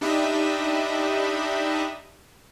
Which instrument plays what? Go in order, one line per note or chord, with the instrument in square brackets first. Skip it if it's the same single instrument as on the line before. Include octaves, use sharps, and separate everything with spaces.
[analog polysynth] D4 D#4 G4 D#5 E5 B5